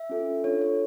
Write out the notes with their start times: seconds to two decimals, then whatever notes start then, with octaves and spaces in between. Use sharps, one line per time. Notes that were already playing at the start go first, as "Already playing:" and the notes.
Already playing: E5
0.09 C#4 F4 A4
0.44 D4 F4 A4 C#5
0.62 C#5